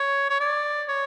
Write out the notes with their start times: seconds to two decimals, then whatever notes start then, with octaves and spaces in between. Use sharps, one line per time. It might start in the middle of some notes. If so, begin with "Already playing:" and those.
Already playing: C#5
0.29 C#5
0.40 D5
0.88 C#5